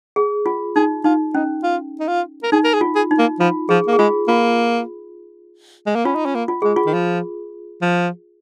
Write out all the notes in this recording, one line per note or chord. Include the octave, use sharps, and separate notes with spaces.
G#4
F4
D#4 G#4
D#4 F4
C#4 D#4
F4
D#4
F4
A#4
D#4 G#4
A#4
G#4
F4
G#4
D#4
A#3
F3 F4
F3 G#4
A#3
G#4
G#3 F4
A#3 F4
G#3
A#3
C#4 F4
D#4
C#4
A#3
F4
G#3 G#4
F4
D#3
F3
F3